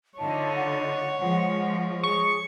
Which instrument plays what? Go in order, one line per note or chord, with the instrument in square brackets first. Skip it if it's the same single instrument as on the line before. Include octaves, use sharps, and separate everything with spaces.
[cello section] D3 D#4 F4 [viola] C#5 [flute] A5
[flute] F#5
[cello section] F3 G#3
[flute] G#4 [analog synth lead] C#6